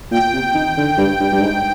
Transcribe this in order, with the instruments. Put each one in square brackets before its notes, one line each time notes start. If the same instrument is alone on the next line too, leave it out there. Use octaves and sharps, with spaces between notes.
[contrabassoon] A#2 [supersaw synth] G5
[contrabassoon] C3
D#3
D3
G2
G2
G2
G#2